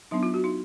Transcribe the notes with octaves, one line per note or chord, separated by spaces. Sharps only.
F#3 B3 D4 D#4
F4
F#4
D#4